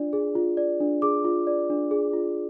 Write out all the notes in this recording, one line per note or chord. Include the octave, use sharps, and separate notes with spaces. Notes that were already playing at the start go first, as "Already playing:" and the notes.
Already playing: D4 F4 D5
G#4
F4
D5
D4
G#4 D6
F4
D5
D4
G#4
F4